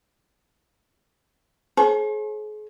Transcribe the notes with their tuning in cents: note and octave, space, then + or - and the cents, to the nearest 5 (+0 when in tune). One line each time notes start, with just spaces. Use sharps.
G#4 +40 C5 +45